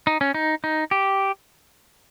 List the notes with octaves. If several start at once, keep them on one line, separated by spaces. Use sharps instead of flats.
D#4
C#4
D#4
D#4
G4